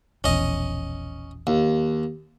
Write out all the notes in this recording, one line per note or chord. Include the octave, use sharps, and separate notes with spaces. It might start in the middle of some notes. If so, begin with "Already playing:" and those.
E1 A#1 E2 C#4 D#5
D#2